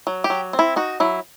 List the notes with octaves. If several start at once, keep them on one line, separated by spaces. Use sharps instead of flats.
F#3
G4
F#3
C4
E4
D#4 F#4
F#3 E4